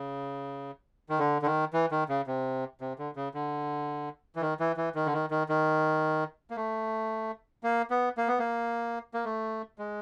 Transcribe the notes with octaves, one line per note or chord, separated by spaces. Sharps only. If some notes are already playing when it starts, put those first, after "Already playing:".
Already playing: C#3
D#3
D3
D3
D#3
E3
D#3
C#3
C3
C3
D3
C#3
D3
E3
D#3
E3
E3
D#3
D3
D#3
D#3
D#3
A#3
A3
A#3
B3
A#3
B3
A#3
A#3
A3
G#3